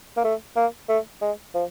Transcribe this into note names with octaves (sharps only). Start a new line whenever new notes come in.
A#3
A3
A#3
A3
G#3
F3